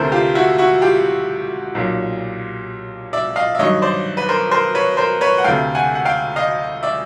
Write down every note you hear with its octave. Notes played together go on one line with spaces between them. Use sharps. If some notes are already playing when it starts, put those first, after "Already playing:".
Already playing: D2 C3 E3 A3 A#4 C5
F4 G4
E4 F#4
E4 F#4
F4 G4
B1 A#2 F#3
D5 E5
D#5 F5
E5
G2 D#3 F#3 C#5 D#5
C5 D5
B4
A#4 C5
A#4 C5
B4 C#5
A#4 C5
B4 C#5
F#5
D2 C3 E3 A3 F5 G5
F#5 G#5
F#5
F5 G5
D#5 F5
D5 E5